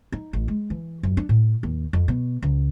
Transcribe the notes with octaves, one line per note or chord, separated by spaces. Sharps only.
D#4
A1
G#3
E3
F#2
D4
A2
D#2
F2
B2
C#2